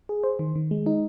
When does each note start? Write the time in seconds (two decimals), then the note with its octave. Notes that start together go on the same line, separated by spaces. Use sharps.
0.09 G#4
0.24 C5
0.39 D#3
0.56 D#3
0.71 G#3
0.86 D#4